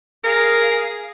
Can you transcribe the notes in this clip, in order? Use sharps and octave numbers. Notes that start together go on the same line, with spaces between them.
G#4 A#4 F5